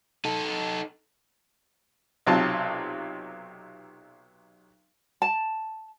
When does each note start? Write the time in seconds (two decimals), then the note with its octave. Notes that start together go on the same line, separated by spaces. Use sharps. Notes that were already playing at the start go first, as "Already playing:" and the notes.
0.25 D#4 A4
2.27 B1 C3 F#3 F4 A5
5.22 A5